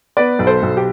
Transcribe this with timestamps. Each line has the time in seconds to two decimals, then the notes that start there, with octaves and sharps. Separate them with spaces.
0.17 B3 B4 D5
0.39 B1
0.47 A4 C5
0.63 B1
0.77 G4